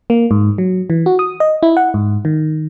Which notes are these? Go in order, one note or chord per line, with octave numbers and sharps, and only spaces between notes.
A#3
G#2
F#3
E3
F#4
D#6
D#5
E4
F#5
G#2
D#3